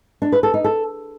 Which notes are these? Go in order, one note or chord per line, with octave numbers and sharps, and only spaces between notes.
D4
B4
A4
D#4
A4